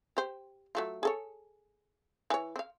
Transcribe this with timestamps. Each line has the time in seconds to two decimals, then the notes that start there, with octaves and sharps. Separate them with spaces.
0.17 G4 C5
0.75 F#3 A3 F4
1.03 G#4 A4 C#5
2.30 E3 C#5
2.56 C4 F5